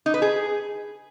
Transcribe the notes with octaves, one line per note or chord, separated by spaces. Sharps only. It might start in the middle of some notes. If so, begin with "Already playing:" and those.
D#4
B4
G#4